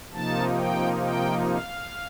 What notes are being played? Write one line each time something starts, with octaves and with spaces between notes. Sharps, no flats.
C3 F3 A#3 D#4 A5
G5
G5
F5